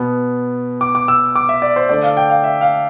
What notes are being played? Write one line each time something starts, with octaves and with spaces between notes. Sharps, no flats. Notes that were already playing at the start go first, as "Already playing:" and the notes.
Already playing: B2 B3
D6
D6
E6
D6
E5
D5
C5
D3 A3 D5
F5
G5
F5
E5
F5